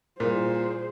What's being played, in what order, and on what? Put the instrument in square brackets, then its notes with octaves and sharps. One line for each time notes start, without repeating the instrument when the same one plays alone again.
[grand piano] A#2 [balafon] G3 E4 A#4 [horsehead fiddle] G#4 C5